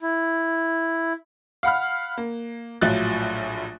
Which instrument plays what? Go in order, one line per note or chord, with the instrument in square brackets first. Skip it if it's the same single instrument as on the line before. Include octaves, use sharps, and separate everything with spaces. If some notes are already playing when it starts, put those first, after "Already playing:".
[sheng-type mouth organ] E4
[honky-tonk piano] F5 F#5 B5 F6
A#3
A#1 A2 F#3 F4 F#6 A6